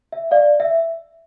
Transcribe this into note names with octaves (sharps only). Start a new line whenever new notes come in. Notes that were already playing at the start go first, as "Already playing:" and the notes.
E5
D5 F5
E5